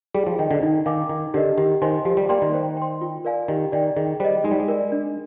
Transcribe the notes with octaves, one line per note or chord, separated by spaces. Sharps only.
G3 G#4
F3
D#3 D#5 G5
D3
D#3 D#4
D#3 A#4 F5 G#5 D6
D#3 D#4
D3 G4 A#4 D#5
D#3 G4
D#3 C5 D#5 G#5 C6
F3 G4
G3
A#3 D5 G5 C6
D#3
C5
G5 C6
F4
A#4 D5 F5 G#5
D#3 G4
D#3 D5 G5
D#3 G#4
G3 C5 D#5
G#3 D#4
G3
G#3
A#4 D5
D4